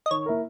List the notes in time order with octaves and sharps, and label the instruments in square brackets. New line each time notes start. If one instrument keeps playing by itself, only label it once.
[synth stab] D#5
[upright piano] D#3 [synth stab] C#5
[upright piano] A#3 E4 A#4